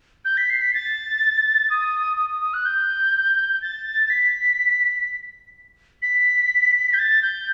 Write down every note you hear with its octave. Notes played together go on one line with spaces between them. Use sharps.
G6
B6
C7
B6
A6
D#6
D#6
D#6
D#6
F#6
G6
G6
A6
A6
B6
B6
G6
A6
G6